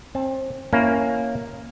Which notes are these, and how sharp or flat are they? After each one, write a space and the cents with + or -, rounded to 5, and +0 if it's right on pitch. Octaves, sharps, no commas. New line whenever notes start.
C4 +25 A5 -10
A#3 +0 C#4 +0 E4 +0